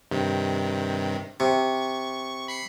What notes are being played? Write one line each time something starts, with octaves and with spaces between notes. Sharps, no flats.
G2 C3 D#3
C3 C#6
B5 C7 C#7